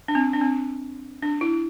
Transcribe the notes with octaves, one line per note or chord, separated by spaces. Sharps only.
D4
C4
D4
C4
D4
E4